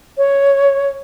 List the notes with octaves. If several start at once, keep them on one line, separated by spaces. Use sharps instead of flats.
C#5